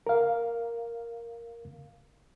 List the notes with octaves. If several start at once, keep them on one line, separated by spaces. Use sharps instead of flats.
A#4 F5